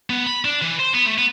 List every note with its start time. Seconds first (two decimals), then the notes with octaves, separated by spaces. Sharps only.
0.10 B3
0.26 B5
0.45 D4
0.62 E3
0.79 C5
0.94 B3
1.06 A3
1.18 B3